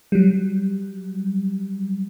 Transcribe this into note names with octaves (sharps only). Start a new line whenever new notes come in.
F#3 G3